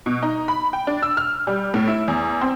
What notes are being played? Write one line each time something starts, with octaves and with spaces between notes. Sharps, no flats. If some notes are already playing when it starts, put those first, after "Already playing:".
B2
D#4
B5
G5
D4
E6
F6
G3
A2
E4
E2
C4